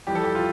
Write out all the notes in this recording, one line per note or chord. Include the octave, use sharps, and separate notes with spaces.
F2 E3 G3 G4
A4
G4
F4